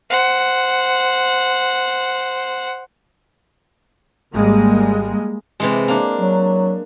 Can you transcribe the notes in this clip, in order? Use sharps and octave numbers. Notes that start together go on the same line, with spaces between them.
C5 F#5
G#1 G3 G#3 A#3 F4
C3 E3 G#3
A#3 D4
F#3